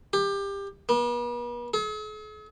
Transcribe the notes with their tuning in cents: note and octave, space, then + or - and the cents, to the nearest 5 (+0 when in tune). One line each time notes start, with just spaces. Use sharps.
G4 +20
B3 -45
G#4 +45